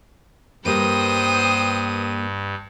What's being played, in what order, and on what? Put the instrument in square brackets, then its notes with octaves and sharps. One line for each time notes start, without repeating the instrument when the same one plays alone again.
[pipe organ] G2 [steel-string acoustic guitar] G3 A#3 B4 [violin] C5 D#7 [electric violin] G5 D#6